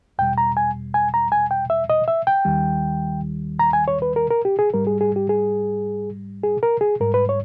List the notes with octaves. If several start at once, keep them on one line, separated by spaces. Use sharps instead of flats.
E2 B2 G3 G5
A#5
G#5
G#5
A#5
G#5
G5
E5
D#5
E5
G5
D#2 D#3 G3
A#5
G#5
C#5
B4
A#4
A#4
G4
G#4
G#2 G3 A#4
G#4
G#4
G4
G#4
G#4
A#4
G#4
G#2 G3 A#4
B4
C#5